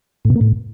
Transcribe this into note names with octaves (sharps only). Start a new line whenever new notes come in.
A2
B2
A#3
A2